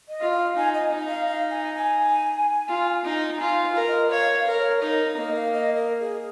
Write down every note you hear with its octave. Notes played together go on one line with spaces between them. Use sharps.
D#5
F4
F5
D#4 G#5
D#5
D#4
F5
F5
G#5
G#5
F4
D#4
F4 G#5
F5
A#4
D#5
C#5 F5
F5
A#4
C#5
D#4 A#4
A#3 D#5
F5
D#5
A#4
G#4